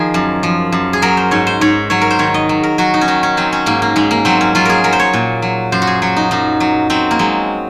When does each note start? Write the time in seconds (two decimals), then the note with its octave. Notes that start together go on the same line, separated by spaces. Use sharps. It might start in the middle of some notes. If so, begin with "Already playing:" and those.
Already playing: D#3 F3 G#4 A#4
0.14 F#2
0.43 F3
0.72 F#2
0.93 G#4
1.02 F#3 A#4
1.17 C5
1.31 G#2 C#5
1.47 C5
1.61 G#2 C#5
1.90 F#3 C#5
2.01 A#4
2.10 C5
2.19 D#3 C#5
2.34 D#5
2.49 F#3
2.63 A#4
2.78 F#3 F#4
2.94 D#4
3.01 C#4
3.08 D#3 D#4
3.23 C#4
3.37 F#3 C4
3.53 C#4
3.66 G#2 A#3
3.82 A#3
3.96 G#2 G#3
4.11 A#3
4.25 F#3 C4
4.41 C#4
4.55 F#3 F4
4.65 G#4 A#4
4.84 F#3 A#4
4.93 C5
4.99 C#5
5.13 A#2
5.42 F#3
5.72 F#2 C5
5.82 F#4
5.87 G#4
6.02 F#3 F#4
6.16 D#4
6.31 F#2 D#4
6.60 F#3
6.90 F#3 C4
7.11 A#3
7.19 F#3 G#3